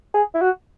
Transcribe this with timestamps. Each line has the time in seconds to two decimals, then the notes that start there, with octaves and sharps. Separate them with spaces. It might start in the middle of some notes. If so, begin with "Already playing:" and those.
0.14 G#4
0.35 E4
0.42 F#4